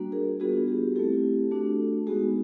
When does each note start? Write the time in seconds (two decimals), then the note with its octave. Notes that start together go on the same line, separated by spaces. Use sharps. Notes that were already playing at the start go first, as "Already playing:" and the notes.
Already playing: G3 A#3 D4 F#4
0.12 G#4 A#4
0.40 G3 B3 D4 F4 F#4 G#4
0.68 G4
0.96 A3 C4 E4 G4 A4
1.51 A3 D4 F#4
2.07 G#3 B3 D#4 F#4 G#4